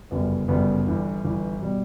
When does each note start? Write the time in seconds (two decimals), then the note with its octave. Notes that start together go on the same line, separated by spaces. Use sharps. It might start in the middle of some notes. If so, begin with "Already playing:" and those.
0.11 G1 F#2 C#3 G3 B3
0.48 G1 F#2 C#3 G3 B3
0.86 G1 G2 E3
1.24 G1 G2 E3
1.62 B2 G3